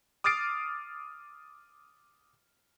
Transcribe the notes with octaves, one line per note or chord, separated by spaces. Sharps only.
D6 D#6 F6 A6 C7 D7